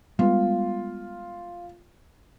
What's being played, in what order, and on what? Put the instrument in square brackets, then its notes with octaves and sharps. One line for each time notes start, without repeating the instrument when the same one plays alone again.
[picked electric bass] G3 G#3 B3 [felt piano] F4